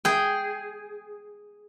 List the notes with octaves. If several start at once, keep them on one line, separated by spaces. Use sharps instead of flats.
G#4 G5